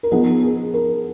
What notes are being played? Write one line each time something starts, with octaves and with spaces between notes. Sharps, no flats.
A#4
F3 B3 D#4 G#4
G#4
A#4